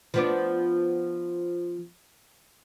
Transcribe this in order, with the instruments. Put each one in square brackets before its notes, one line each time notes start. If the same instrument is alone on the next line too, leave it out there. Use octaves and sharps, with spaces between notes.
[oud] F3 B3 D4